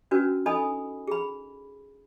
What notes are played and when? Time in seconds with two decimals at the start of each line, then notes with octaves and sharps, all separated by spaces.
0.11 C#4 D4 F#4 A#4 B4
0.46 D#4 A4 D#5 G#5 B5 D#6
1.08 G#4 B5